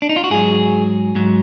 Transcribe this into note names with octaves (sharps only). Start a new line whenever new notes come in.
D4
D#4
F4
F#4
G#2 F#3 G#4
G#2 F#3